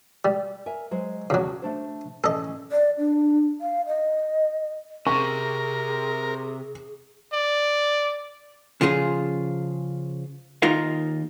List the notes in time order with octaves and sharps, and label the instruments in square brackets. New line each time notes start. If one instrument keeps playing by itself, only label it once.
[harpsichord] G3
[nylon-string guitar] A#4 E5 G#5
F#3 G#3 C5
[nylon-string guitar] E2 F#4 A5 [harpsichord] C#3 F#3
[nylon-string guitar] A3 D4 C5
[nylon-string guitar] A2 E3 C#4 [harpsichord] A4 D#5
[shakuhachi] D5
D4
F5
D#5
[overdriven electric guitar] C3 [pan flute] G#4 [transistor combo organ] A#4 [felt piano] C#6
[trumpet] D5
[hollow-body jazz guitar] C#3 F3 F4 G#4
D#2 D#4 F4 A#4 F5